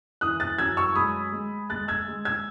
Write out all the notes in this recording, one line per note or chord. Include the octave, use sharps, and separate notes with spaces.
E3 D#6 F#6
F#6 A6
F#2 E6 G#6
C#6 E6
G#3 B5 D#6
G#3
G#3 F#6 A6
E6 G#6
G#3
E6 G#6